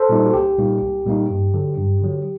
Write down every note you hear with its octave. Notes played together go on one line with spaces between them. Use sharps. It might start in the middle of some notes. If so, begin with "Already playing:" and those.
Already playing: A4 C5
A#2 G3 A#3 D#4
F#4
C2 G4
A#2 G3 A#3 D#4
C2
A#2 G3 A#3 D#4
G2
D3 F#3
G2
D3 F#3